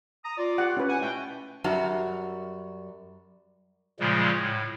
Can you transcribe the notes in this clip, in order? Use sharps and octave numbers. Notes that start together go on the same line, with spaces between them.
A#5 D#6
F4 D5
G4 F#5
C#4 E4 B4
F#5 G#5
B2 A3 G5
F#2 G3 F#4 A#5
A#2 C#3 F3 G3 G#3
A2